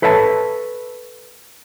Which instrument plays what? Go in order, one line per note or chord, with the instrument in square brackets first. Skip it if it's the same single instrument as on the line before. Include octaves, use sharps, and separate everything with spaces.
[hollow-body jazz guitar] A4 B4 C#5 E5 F5 A5